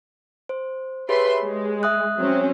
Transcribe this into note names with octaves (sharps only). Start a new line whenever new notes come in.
C5
G4 G#4 B4 C#5 E5 C6
G#3
E5 D#6 F#6
F#3 C4 C#4